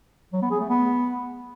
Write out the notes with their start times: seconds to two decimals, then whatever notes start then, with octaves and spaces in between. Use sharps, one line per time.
0.33 F#3
0.42 B3
0.51 G#4
0.60 A3
0.69 B3